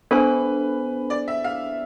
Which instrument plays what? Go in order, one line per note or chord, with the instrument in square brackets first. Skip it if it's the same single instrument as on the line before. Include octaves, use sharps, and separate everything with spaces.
[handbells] B3 D4 A4 C5 G#5 [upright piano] B4
[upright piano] D5
E5
F5